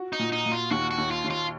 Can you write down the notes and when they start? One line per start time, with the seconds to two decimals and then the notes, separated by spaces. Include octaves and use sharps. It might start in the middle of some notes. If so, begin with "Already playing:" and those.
Already playing: F#4
0.13 D#4
0.19 A#2
0.32 D#4
0.46 A#2
0.52 F4
0.71 D#2 F#4
0.91 F#4
0.98 D#2
1.11 F4
1.24 D#2
1.30 F4